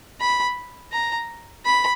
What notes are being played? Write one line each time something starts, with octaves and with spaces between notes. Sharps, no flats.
B5
A#5
B5